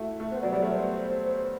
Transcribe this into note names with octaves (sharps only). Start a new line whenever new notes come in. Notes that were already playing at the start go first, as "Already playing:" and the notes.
Already playing: A3 E4 F#4
A3
B3 C5
F#3 D5
G3 D5
A3
B3 C5